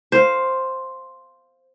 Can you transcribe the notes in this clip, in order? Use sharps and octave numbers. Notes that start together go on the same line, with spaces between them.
C5 F5